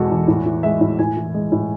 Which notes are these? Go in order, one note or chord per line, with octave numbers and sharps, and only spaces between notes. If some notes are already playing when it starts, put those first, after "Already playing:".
Already playing: E2 B2 G#3 F#4 A4
E2
A2
E3
G#3 E5
A2
A2 G#5
E3
G#3
A2